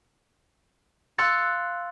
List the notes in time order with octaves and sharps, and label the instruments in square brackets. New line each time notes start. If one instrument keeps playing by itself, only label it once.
[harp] F5 C6 E6 F#6 A6 C#7